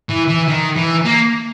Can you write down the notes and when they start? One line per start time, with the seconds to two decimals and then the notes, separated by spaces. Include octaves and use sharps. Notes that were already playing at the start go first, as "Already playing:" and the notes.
0.09 E3
0.28 E3
0.48 D#3
0.76 E3
1.05 A#3